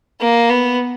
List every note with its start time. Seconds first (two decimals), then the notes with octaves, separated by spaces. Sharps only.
0.21 A#3
0.50 B3